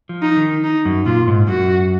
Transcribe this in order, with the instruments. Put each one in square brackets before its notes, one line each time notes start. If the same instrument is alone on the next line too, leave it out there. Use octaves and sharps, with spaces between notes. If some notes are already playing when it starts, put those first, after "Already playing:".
[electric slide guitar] F3
[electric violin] D#4
[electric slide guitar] D#3
[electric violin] D#4
[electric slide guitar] F#2
[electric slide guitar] A#2 [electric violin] F4
[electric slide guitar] G#2
[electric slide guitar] F#2 [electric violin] F#4